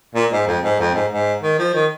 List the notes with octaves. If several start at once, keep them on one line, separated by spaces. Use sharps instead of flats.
A#2
G#2
F2
G#2
F2
G#2
G#2
D#3
F3
D#3